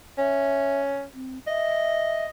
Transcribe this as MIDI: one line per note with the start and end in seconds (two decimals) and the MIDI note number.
0.18 1.04 61
0.18 0.81 76
1.14 1.39 60
1.47 2.29 75
1.47 2.25 76